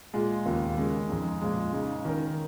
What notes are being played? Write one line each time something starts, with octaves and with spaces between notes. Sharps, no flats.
A#2 G#3 F4 G#4
D#2 C#3 A#3 F4
C#3 G#3 C#4
F2 C#3 G#3 D#4 G#4
A#2 F3 G#3
C#3 G#3 D#4
D#3 C#4 A#4